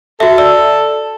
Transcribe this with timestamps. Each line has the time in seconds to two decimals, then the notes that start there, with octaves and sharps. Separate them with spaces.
0.20 F#4 A4 E5
0.38 D5 E6